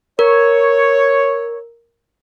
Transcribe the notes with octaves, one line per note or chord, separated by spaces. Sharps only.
A#4 C#5